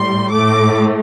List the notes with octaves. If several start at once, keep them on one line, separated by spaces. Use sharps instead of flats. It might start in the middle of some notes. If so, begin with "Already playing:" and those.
Already playing: A2 G3 C6
A2 A3 D6